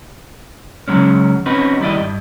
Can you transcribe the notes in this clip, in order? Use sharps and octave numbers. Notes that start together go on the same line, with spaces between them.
C#3 F#3 G#3 C#4
C4 C#4 D#4 F#4 B4
D#3 G3 E4 D5 D#5
G2